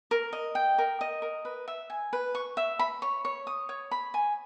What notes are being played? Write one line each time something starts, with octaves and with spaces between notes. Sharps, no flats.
A#4
D#5
G5
A#4
D#5
A#4
B4
E5
G#5
B4
C#6
E5
B5
C#5
C#5
D#6
C#5
B5
G#5